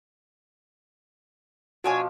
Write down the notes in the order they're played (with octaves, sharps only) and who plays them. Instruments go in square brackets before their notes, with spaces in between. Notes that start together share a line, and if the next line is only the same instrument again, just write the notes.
[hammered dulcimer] B2 F3 D6 [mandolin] D4 C#5 G#5 [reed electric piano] F#4